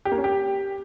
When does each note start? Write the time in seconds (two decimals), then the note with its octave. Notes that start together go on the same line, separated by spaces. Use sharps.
0.05 G4
0.12 A#3
0.18 C#4
0.24 G4